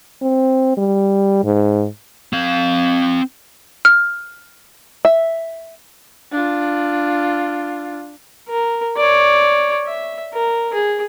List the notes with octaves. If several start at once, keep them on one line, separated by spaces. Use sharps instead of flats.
C4
G3
G#2
C4 F5
F6
E5
D4 F4
A#4
C#5 D5
E5
A#4
G#4